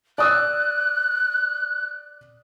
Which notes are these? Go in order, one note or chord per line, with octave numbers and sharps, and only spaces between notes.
D5 D#6 E6 F#6